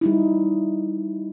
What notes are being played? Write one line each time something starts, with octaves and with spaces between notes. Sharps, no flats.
G3 D#4 E4